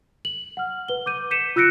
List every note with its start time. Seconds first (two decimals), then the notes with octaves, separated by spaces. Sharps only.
0.25 F#7
0.57 F#5 F6
0.89 B4 G7
1.06 D6 G6 D#7
1.31 G6 B6 C#7 D#7 E7
1.56 F4 E6 F#6 A#6 C#7 D7